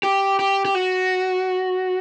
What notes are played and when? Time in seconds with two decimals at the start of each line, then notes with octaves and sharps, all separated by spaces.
0.03 G4
0.39 G4
0.65 G4
0.75 F#4